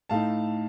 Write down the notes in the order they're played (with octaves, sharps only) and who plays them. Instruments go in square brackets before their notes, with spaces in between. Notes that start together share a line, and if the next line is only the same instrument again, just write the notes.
[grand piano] A2 A3 D#4 F5 A5